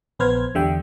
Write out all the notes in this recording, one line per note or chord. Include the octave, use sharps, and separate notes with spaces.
A#1 B3 B4 C5 F6 G#6
E2 D3 G3 E5 G5